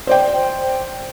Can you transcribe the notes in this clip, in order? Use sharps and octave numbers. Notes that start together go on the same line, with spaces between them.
C5 D5 G5